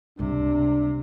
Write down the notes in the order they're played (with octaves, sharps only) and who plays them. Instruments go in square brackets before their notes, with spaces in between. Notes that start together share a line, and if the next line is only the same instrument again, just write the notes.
[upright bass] C#2 G3 [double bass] C3 [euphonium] D4